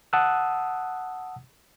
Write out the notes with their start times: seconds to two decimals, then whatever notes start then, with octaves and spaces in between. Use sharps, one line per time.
0.13 F#5 A5 D#6 E6 F#6